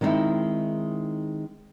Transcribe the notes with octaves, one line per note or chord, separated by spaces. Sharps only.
D#3 G#3 C4 C#4 D#4 E4